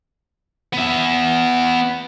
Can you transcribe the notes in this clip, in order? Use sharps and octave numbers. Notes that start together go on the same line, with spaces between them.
B3 E5